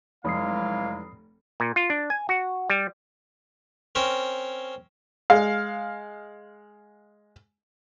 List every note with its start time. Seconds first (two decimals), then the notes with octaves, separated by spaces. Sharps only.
0.25 F1 E3 F#3 G#3 F5 B5 D#6 C7
1.60 A#2
1.76 F4
1.90 D4
2.10 G#5
2.29 F#4
2.70 G3
3.95 C4 C#4 A#4 C5
5.30 G#3 F5